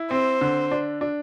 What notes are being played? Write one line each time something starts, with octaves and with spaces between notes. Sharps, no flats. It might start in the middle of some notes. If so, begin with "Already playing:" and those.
Already playing: E4
C4 C5
D3
D4
D4